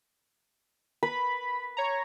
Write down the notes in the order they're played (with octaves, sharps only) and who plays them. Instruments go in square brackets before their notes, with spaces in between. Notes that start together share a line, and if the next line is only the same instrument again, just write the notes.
[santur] B4 [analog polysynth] B5
[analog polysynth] C#5 A#5